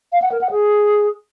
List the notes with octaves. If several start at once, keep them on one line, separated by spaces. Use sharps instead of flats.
F5
F#5
A#4
F#5
G#4